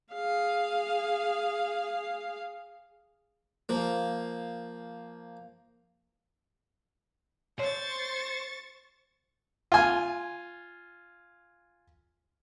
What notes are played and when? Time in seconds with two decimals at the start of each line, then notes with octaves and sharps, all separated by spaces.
0.14 G#4 F5
3.69 F3 A#3
7.59 C5 C#5 C#6 A6
9.72 F4 G#5